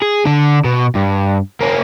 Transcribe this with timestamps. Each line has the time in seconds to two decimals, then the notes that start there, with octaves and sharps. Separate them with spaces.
0.02 G#4
0.25 D3 D4
0.64 B2
0.95 G2
1.61 A#3 C#4